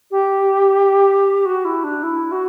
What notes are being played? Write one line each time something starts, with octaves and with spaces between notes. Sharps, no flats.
G4
F#4
E4
D4
E4
F#4